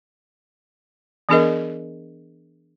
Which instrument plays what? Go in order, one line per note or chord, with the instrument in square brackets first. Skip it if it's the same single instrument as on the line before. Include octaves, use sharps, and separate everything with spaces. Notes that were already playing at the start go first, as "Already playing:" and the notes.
[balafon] E3 B3 D4 G#4 A#4 D#5